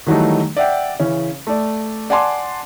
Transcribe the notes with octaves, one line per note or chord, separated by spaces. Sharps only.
D#3 E3 F#3 G3 A3 D#4
D5 E5 F#5 G5
C#3 E3 C#4
A3 D5
D5 F#5 G#5 A5 C6 D6